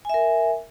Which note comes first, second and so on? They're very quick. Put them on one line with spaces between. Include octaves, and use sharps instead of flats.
G#5 E5 A#4